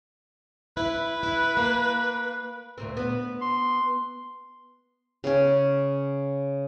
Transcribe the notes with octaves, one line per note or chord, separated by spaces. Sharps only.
E4 B4
E4
A#3
D2 A#2 C4
B3
C6
C#3 C#4